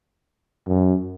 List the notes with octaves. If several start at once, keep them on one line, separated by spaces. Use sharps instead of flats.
F#2